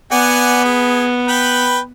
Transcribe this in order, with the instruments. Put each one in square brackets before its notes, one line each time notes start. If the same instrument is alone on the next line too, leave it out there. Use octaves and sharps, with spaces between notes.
[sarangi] B3 [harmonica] D5 F#5 G#5
[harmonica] G#4
B4 G5 B5